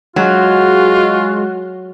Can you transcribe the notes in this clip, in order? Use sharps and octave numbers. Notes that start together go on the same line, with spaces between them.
F#3 G#3 F4 F#4